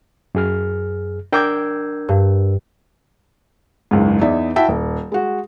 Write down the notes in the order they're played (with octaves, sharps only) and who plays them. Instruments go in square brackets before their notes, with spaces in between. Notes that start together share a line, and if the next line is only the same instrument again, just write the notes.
[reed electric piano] F#2 G#4 F6
[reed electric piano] D4 A#4 E6 [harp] G5 D6 G#6
[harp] G2
[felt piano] F#1 C#2 G#2
E2 D#4 D5 E5
E4 F#4 E5 G5 A5
D#1
G#3 F#4